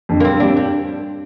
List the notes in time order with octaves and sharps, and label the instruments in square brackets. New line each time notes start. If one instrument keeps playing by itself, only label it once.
[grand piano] F2 D3
[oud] A#3
[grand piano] G2 [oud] C4
[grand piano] G3 C4 [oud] D4
[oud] G3